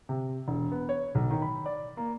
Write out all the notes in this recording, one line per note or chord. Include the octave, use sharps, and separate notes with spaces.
C3
E1
B3
C#5
B1
D#3
B5
D5
A#3